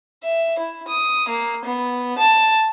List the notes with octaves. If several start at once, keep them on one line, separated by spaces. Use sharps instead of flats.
E5
E4
D#6
A#3
B3
A5